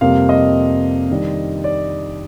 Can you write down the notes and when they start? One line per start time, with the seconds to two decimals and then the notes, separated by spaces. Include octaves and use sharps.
0.01 F2 C3 G3 A#3 F5
0.29 D#5
1.10 D#3 G3 D4
1.64 D5